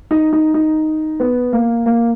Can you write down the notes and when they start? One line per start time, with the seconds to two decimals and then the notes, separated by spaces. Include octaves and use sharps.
0.11 D#4
0.33 D#4
0.54 D#4
1.20 B3
1.53 A#3
1.86 A#3